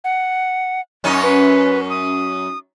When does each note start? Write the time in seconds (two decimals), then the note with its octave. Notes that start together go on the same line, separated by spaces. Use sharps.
0.04 F#5
1.04 F#2 C#4 D#4
1.23 B4
1.90 D#6